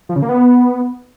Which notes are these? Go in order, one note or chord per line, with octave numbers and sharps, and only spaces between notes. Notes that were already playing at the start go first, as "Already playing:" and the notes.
F3
C#3
A#3
B3